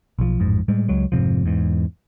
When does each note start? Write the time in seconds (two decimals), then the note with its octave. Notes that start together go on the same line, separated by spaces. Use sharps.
0.19 B1 F3
0.40 A1 F2 G#2
0.68 A2 G3 G#3
0.88 C#2 F#3 G#3
1.12 F1 G#2 C3 F3
1.46 E2 G#2